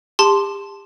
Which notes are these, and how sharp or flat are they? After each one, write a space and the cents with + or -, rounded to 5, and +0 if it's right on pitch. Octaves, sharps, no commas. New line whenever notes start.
G4 +35 A5 +0 C6 +0